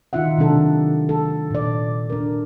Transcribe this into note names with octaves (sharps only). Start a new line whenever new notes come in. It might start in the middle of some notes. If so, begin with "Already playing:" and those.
D#3 D#4 F4 E5 F#5
C3 D#3 F#3 D4 A4
A4
A#2 D5
D4 A#4